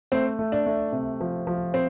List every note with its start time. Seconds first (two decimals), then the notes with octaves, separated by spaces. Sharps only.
0.12 A3 C4
0.39 A3
0.52 D4
0.66 A3
0.92 C3
1.21 F3
1.47 F3
1.74 C4